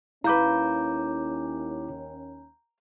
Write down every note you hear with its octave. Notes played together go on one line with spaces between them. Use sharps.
D#2 C#4 E4 B4 F5 A#5 D6 G6